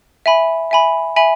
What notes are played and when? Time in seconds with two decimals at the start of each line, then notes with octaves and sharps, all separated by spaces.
0.26 E5 G#5 B5
0.71 E5 G#5 B5
1.16 E5 G#5 B5